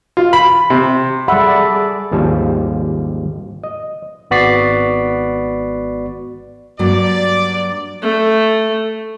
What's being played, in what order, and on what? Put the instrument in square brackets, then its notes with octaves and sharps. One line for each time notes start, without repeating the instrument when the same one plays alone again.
[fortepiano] F4
B5
C3
[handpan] G3 F#5 [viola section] G#4 A4 D5 [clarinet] E5 [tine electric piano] B5 E6
[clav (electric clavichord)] G#1 D#2 F3 G3 G#5 A5
D#5
[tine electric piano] G#1 B3 F#4 D5 B6 C7
[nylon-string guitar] G2 F#3 A#3 [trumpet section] D5
[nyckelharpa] A3